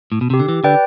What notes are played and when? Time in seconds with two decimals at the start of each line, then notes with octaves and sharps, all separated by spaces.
0.12 A2
0.21 B2
0.30 C3 G4
0.39 D3
0.49 E3
0.64 D3 B4 D5 G5